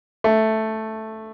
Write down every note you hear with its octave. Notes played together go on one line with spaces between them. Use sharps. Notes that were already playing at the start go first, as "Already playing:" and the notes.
A3